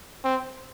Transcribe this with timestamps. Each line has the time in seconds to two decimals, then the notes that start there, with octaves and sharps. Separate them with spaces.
0.24 C4